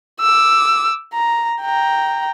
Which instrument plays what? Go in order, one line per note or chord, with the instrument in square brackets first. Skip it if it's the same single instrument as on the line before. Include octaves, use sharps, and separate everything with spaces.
[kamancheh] D6 E6
A#5
G5 A#5